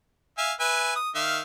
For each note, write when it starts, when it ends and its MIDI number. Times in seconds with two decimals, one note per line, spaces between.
0.38 0.53 76
0.38 0.53 77
0.38 0.53 80
0.60 0.94 71
0.60 0.94 76
0.60 0.94 80
0.96 1.10 87
1.15 1.41 51
1.15 1.41 76
1.15 1.41 77